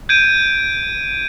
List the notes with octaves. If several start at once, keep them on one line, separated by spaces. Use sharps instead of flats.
G6 G#6 D7 D#7